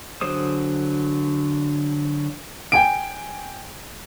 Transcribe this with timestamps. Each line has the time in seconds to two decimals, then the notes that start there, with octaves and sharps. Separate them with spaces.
0.21 D3 F#3 G#4 C5 D#6
2.72 G5 G#5 D7